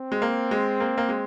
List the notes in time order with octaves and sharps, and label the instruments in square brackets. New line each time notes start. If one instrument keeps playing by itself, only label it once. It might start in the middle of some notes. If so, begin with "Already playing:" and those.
Already playing: [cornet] C4
[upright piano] G#3
A#3
G#3
A#3
A#3
G#3